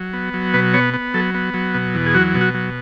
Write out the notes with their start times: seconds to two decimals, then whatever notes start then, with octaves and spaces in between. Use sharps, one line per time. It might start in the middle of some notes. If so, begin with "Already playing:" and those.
Already playing: F#3
0.13 B3
0.33 F#3
0.53 B2 B4
0.74 B3 C#5
0.94 B3
1.14 F#3 A4
1.35 B3
1.54 F#3
1.74 B2
1.94 E2
2.06 G#4
2.14 F#3 F#4
2.35 B2
2.41 F#4
2.54 F#3